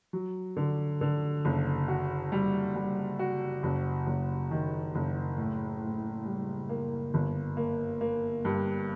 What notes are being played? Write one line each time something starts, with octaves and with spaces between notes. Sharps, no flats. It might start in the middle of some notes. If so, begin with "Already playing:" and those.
F#3
D3
D3
F#1
F#4
G3
G3
F#4
F#1
F#1
D#3
F#1
A2
A2
G3
A#3
G1
A#3
A#3
G2